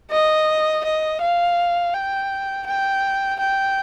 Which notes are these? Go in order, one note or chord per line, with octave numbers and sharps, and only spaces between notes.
D#5
D#5
F5
G5
G5
G5